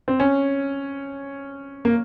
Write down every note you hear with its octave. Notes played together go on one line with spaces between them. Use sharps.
C4
C#4
A#3